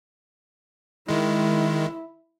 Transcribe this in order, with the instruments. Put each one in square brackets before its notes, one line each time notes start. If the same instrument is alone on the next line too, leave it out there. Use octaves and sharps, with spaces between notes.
[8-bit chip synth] D#3 G#3 [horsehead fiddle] E4